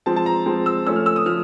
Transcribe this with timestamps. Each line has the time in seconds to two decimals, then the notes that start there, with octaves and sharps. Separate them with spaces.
0.06 F3 G#3 C4 A5
0.16 A5
0.26 A#5
0.46 F3 G#3 C4
0.66 E6
0.87 F3 A3 C#4 E6
0.96 F6
1.06 E6
1.16 D#6
1.26 F3 A3 F6